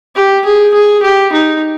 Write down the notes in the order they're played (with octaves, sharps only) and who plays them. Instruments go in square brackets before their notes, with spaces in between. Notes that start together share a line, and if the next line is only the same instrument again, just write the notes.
[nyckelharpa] G4
G#4
G#4
G4
D#4